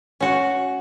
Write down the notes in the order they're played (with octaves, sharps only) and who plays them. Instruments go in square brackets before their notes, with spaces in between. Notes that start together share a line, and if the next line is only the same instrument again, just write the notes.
[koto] C#4 F#4